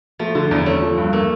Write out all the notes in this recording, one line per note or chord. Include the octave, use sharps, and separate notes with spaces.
F3 A3
D3 F3
E2 G3
A3 C#4
F3
G2
A3 A#3